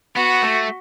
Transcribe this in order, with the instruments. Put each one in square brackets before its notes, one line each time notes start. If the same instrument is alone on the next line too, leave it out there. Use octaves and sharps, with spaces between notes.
[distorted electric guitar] B3 [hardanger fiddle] F#4
[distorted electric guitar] A3